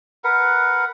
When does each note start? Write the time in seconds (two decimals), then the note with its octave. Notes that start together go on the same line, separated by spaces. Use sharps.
0.24 A#4 B4 F#5